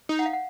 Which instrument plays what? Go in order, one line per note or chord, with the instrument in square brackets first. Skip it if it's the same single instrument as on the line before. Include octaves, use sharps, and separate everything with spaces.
[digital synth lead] D#4
[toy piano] F#5
F5
F#5